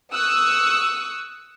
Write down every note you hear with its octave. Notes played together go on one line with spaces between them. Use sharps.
C#6 D#6 E6 F#6